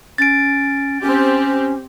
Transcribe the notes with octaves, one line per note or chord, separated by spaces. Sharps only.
C#4 A6 D7
C4 C#4 G4